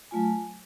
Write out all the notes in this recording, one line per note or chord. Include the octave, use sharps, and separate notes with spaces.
F#3 A3 F4 G#5